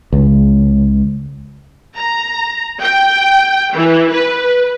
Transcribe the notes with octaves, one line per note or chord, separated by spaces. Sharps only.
C#2
A#5
G5
E3
B4